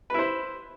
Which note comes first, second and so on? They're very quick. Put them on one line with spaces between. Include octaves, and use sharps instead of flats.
B4 E4 C5